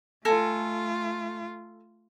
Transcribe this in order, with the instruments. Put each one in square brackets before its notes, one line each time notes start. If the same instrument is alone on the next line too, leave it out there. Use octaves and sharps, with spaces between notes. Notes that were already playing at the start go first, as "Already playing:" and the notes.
[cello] A3 F4 [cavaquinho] A4 G#5 A#5